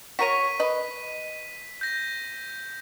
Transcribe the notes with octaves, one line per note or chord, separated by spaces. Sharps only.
F#4 A#4 C#5 B6 D#7
B4 D#5
G6 A#6